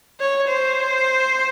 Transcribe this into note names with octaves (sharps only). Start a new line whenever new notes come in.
C#5
C5